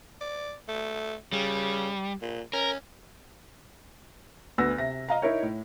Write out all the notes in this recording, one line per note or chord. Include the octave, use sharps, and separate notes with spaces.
D5
A3
C#3 G3
A#2
C#4 A#4
D2 B3 E6 A#6
C3 E5 A#6
D#5 F5 A#5
D#4 E4 A#4 C#5
A2